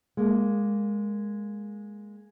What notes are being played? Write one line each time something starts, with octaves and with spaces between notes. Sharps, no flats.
G#3 A#3